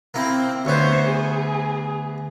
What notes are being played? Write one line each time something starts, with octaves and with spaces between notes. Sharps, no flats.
A#3 C4 E4
D2 B3 C5 C#5
G#4